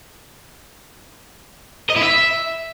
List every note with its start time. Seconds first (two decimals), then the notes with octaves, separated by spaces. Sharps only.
1.90 D#5
1.96 E4
2.03 E5